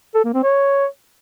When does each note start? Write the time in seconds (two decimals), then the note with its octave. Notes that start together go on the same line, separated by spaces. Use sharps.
0.15 A4
0.24 A#3
0.34 C4
0.44 C#5